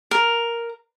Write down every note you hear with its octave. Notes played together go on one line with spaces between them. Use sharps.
A#4